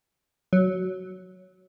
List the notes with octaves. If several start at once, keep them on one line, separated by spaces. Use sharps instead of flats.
F#3